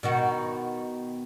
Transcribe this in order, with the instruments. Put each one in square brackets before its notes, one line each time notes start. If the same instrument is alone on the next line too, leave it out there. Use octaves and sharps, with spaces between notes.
[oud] B2 D#3 F#4